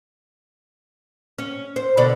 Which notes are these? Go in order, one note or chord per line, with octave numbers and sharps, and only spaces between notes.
C#4
C5
B2 D3 D5